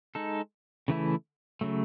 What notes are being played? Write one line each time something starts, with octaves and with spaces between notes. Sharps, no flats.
G#3 D#4 A4
C#3 E3 A3 E4
C#3 F#3 A3